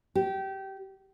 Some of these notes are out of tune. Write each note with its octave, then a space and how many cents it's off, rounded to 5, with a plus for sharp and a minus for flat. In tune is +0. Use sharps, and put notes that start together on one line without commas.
G4 -20